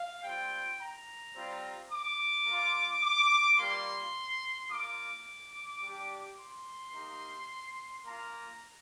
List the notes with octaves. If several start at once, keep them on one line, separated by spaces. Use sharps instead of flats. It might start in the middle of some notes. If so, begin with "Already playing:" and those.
Already playing: F5
G3 C4 F4 G5
A#5
G3 C4 F4
D6
A#3 F4
D6
G3 A#3 F4 C6
A#3 F4 D6
G3 D4 G4
C6
A#3 D#4 G4
A#3 F4 A#5